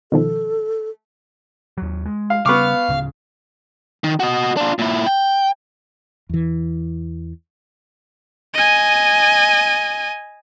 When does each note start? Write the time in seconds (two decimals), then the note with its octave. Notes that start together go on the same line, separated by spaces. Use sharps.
0.12 B2 D#3 F3 A4
1.78 D#2 F#3
2.06 G#3
2.30 F5
2.46 C#3 G3 B3 F5 C#6 D6
2.89 D1 C#3
4.04 D#3
4.20 F#4 D#5
4.57 D4 F4
4.79 A#2 E4
5.07 G5
6.29 E2 E3
8.54 D#5 G#5